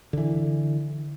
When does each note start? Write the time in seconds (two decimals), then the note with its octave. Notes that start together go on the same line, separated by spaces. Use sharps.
0.13 D3 E3